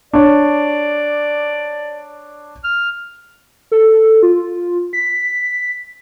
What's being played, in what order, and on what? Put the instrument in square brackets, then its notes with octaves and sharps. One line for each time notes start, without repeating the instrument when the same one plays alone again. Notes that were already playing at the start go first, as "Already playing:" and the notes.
[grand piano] D4 C#5 [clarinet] D5
[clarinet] F6
[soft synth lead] A4
F4
B6